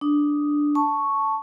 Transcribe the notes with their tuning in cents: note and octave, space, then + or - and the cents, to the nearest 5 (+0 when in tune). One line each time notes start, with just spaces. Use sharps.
D4 +0 D#6 +0
A5 +0 C#6 +0